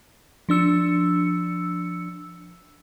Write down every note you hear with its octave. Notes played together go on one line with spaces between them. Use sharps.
F3 D4 E6 C#7